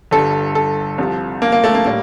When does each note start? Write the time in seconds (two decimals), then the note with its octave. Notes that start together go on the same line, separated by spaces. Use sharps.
0.11 G1 G2 D3 G3 A4
0.55 A4
0.98 C2 C3 F3
1.42 A#3
1.52 A#3
1.64 A3
1.75 A#3
1.85 A2 G3 A#3